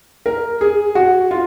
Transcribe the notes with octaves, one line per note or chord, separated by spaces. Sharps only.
A#4
G#4
F#4
F4